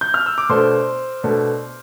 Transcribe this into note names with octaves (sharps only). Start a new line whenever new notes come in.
G6
F6
E6
D6
B2 A3 D4 C5 C6
B2 A3 D4